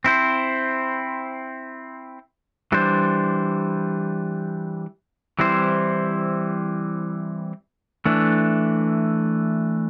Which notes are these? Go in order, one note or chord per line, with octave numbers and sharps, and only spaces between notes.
C4 E4 C5
E3 G3 D4 C5
E3 G3 C4 E4 C5
E3 A3 D4